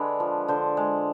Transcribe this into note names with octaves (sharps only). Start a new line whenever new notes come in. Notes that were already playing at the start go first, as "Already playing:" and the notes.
Already playing: D3 G#3 B4
F3
D3 C5
G#3